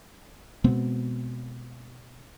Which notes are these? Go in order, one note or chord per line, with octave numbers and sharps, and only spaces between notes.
B2 G#3 B3 C4